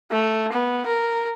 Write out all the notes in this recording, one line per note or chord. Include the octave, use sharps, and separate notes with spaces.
A3
B3
A#4